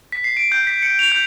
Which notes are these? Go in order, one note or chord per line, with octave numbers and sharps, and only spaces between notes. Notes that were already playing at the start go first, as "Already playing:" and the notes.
B6
C7
D7
G6
B6
C#7
F7
G6